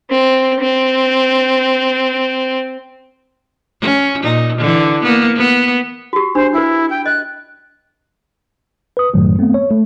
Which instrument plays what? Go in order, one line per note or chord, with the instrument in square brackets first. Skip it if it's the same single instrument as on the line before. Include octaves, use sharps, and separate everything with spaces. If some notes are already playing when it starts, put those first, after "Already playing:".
[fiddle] C4
C4
[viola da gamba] C#4
A#2 D#4
D3 E3
A#3 B3
B3
[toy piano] F#4 G4
[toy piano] D4 [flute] C5
[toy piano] D4 B4 [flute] E4
[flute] G5
[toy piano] D#5 [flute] F#6
[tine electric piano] B4 D#6
F#2 A2 D#3 F#3 A3
A3 B3 C4
C#5
A3